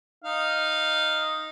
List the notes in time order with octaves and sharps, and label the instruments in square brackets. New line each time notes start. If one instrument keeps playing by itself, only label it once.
[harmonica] D#4 F5